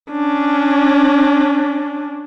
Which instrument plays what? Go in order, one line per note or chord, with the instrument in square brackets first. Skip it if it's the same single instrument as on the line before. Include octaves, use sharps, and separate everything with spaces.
[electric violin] C#4 D4